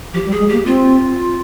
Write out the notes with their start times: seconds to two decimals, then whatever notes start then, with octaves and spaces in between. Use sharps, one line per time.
0.13 F3 G4
0.26 G3
0.31 G#4
0.39 G#3
0.49 A#3 G4
0.66 C4 F4